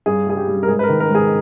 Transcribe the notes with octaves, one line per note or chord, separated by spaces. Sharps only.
G2 G#4
G3 G#4
G4
G3
A#4
G#2 G#4
B4
A#4
D#3
A#4
G#2 G#4